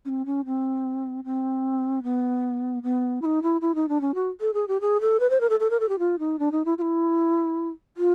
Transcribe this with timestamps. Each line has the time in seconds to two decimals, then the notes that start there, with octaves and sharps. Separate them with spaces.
0.05 C#4
0.09 C4
0.26 C#4
0.46 C4
1.24 C4
2.03 B3
2.83 B3
3.22 E4
3.25 D#4
3.43 E4
3.61 E4
3.75 D#4
3.89 D4
4.01 C#4
4.14 F#4
4.41 A4
4.54 G#4
4.68 G4
4.81 G#4
5.01 A4
5.20 B4
5.30 C5
5.41 A#4
5.50 A4
5.60 A4
5.70 A#4
5.80 A4
5.89 G4
5.99 F4
6.19 D#4
6.39 D4
6.52 D#4
6.65 E4
6.78 F4
6.81 E4
7.97 F4